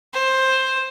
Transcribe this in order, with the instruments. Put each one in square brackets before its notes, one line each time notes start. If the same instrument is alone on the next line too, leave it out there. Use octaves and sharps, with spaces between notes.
[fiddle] C5